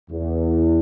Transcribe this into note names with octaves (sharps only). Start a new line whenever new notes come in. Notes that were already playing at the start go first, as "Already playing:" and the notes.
E2